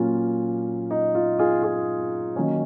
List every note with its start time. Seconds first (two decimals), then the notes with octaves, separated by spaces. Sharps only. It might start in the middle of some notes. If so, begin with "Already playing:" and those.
Already playing: A#2 F#3 A#3 C#4 F4
0.91 D#4
1.15 F4
1.39 F4 G#4
1.63 F4 G#4
2.36 D#3 F#3 A#3 C#4